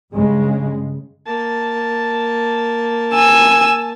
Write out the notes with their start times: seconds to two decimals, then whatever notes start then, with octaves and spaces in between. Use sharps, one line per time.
0.12 G2 C#3 G#3
1.27 A#3 A5
3.15 G#5 E6